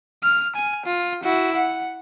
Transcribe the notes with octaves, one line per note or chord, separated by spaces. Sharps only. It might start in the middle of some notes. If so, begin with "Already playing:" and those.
F6
G#5
F4
E4 F#4
F#5